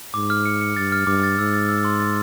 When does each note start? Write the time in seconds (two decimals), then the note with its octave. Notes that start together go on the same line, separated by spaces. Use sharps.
0.14 G#2 D6
0.30 F6
0.46 C#7
0.61 C#7
0.76 G2 A6
0.92 F6
1.07 G2 D6
1.23 A6
1.38 G#2 E6
1.54 A6
1.69 E6
1.85 C6
2.00 A6